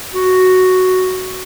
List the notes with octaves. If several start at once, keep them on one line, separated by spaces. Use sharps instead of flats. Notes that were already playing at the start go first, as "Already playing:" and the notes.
F#4